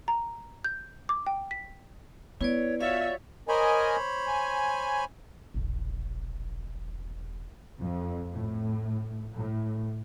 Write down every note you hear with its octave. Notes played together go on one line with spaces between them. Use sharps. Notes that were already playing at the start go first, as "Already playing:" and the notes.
A#5
G6
D6
G5
B6
B3 E4 B4 C#5 D5
F4 F#4 C#5 D5 E5 F5
A#4 C5 C#5 D#5 G#5 B5
G#5
E1 A#1
F2
A2
A2